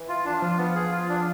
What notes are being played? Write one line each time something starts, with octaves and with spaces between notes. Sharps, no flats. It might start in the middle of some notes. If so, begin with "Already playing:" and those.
Already playing: E3
F4
D4
F3 F4
B3
G#4
F4
D4